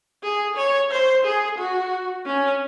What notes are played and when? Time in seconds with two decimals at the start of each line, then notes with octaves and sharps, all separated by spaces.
0.23 G#4
0.57 C#5
0.91 C5
1.25 G#4
1.58 F#4
2.26 C#4